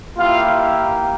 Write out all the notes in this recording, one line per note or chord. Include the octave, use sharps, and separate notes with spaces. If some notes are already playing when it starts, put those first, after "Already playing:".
A#3 E4 F4 G4 F5